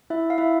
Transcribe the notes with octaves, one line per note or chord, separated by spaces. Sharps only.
E4 E5
F5
E4 E5